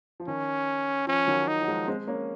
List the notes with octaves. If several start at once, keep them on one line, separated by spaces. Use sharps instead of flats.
F3
D#3 C#4
F3 C#4
D#3 F#3
D#4
F#3
F3 G#3
G#3 C4
A#3 C#4